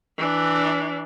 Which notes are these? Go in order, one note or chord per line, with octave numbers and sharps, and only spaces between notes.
E3 D4